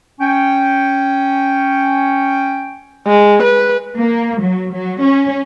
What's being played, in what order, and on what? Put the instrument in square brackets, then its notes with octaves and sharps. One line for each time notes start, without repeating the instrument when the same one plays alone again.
[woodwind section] C#4 G5
[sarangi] G#3
B4
[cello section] A#3
F#3
F#3
C#4